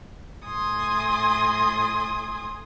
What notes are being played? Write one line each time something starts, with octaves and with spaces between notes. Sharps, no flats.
A2 G#5 C6 D#6